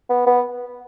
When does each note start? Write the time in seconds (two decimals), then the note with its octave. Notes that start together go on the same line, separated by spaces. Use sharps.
0.09 B3
0.27 B3